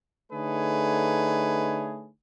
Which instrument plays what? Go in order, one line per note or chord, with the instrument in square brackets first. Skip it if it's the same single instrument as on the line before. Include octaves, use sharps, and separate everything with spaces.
[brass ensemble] D3 A3 D#4 G#4 B4 C#5